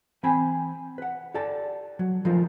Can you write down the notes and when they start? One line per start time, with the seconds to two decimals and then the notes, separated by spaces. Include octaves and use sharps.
0.23 E3 C4 G5 G#5 B5
0.98 B4 F#5
1.34 G4 A4 D5 A5
1.99 F#3
2.25 D#3 F3 A3 D#4 F4 A#4